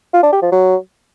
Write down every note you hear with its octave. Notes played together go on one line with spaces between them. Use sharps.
F4
D4
G4
F3
F#3